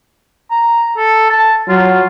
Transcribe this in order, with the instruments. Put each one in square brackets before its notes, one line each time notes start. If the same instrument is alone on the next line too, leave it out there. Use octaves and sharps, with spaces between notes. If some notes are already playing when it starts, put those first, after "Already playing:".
[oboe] A#5
A4
A5
[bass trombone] F#3 [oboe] F4